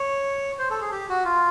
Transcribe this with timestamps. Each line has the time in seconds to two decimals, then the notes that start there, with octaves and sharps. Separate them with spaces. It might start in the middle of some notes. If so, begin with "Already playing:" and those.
Already playing: C#5
0.59 C5
0.71 A4
0.81 G#4
0.92 G4
1.09 F#4
1.25 F4